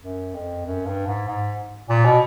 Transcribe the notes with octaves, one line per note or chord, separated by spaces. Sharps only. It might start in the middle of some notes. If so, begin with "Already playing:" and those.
F#2
F2
F#2
G2
G#2
G#2
A#2
B2